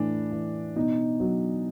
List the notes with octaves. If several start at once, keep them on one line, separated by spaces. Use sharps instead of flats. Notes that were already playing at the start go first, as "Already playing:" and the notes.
Already playing: A2 E3 D4
E3
B2 D#4
F#3